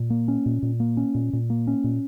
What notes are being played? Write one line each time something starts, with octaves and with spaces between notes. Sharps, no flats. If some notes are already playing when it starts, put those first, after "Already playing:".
Already playing: A#2
A#3
C#4
A#2
A#2
A#3
C#4
A#2
A#2
A#3
C#4
A#2